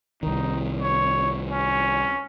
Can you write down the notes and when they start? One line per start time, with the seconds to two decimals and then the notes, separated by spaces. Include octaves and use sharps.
0.23 C2 D#3 D#4
0.81 C#5
1.50 C#4